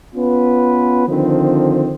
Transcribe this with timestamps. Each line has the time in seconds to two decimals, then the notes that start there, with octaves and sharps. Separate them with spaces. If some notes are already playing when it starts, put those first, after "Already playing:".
0.15 B3 C#4 F4 B4
1.07 D3 D#3 F3 C4